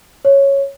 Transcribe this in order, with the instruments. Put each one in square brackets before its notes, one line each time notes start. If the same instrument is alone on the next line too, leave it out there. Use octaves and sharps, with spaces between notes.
[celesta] C#5